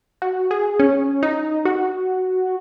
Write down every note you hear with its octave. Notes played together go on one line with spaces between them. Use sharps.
F#4
G#4
C#4
D#4
F#4